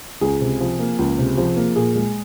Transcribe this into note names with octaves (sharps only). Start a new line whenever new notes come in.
C#2 G#4
C3
F3
A#3
C#2
C3
F3
A#3
A#2 G#4
G#3